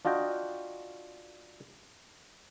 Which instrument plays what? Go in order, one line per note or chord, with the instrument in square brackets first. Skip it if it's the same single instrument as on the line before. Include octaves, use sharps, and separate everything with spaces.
[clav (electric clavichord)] D4 F4 F#4 D#5 G5